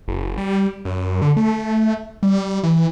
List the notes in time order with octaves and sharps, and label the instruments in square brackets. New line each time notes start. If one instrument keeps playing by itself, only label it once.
[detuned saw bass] F#1
G3
F#2
D3
A3
G3
E3